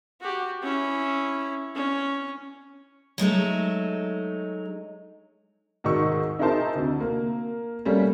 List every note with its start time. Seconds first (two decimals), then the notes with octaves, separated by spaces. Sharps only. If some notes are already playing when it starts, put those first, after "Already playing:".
0.21 F#4 G4
0.63 C#4 E4
1.75 C#4
3.18 F#3 G#3 A3 D#4
5.84 G#2 D#3 D#4 C#6 E6
6.39 D#4 E4 G#4 A#4 C5 A5
6.75 D2 C3
7.00 A#3
7.85 G3 A3 A#3 C#4